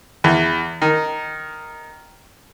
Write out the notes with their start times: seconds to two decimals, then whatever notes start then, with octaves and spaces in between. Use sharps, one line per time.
0.24 E2
0.82 D#3